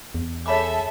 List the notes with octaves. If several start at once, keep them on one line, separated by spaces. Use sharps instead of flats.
E2
G#4 A4 C#5 E5 B5 D6